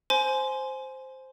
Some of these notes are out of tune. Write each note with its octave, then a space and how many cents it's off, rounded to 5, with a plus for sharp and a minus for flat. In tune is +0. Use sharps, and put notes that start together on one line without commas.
C5 +0 G#5 +20 C6 -15